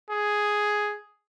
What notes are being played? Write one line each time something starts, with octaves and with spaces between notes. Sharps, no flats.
G#4